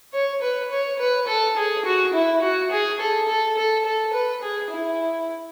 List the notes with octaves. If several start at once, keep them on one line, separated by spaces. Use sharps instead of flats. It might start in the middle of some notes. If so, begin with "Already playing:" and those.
C#5
B4
C#5
B4
A4
G#4
F#4
E4
F#4
G#4
A4
A4
A4
A4
B4
G#4
E4